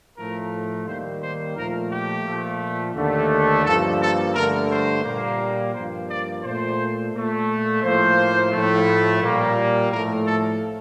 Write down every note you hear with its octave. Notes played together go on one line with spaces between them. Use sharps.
A2 F3 A3 A#4
D#2 D#3 G3 A#3 C5
C5
A#2 F3 A3 A#4
G4
A#2 F3 A3
D#2 D3 A3
G2 F3 A#3 A4
A4
G2 D3 A3 A#4
C5
A#2 G3 A#3
G2 F3 A#3 C5
D5
A#2 A3 C5
A#2 A3
A2 F3 A#3 C5
A2 F3 A3
A#2 G3 A#3
A2 F3 A3 A#4
A4